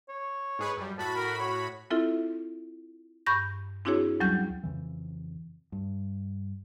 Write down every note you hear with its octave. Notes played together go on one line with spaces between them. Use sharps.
C#5
G#2 G#4 B4
F#2 G3
A2 F#4 A5 B5
A#4
C#5
C4 E4 F4 A4 E5
G2 B5 C#6 G6 A#6
C4 D4 E4 F#4 G#4 C#5
D2 F#3 G3 C#4 G6
F2 C#3 E3
G2